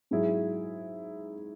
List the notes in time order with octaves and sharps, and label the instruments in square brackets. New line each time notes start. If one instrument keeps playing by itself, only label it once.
[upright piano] G#2 F#3 E4 G#4